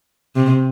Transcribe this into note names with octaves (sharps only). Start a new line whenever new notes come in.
C3